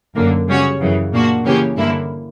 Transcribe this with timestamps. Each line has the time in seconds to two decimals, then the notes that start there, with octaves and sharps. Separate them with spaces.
0.15 F#2 D3 A#3
0.47 C#3 G3 C#4 F#4 C#5
0.79 F#2 C#3 E3
1.12 A#2 A#3 D4 F#4
1.44 C#3 E3 A#3 C#4 G4
1.77 G2 D3 A#3 E4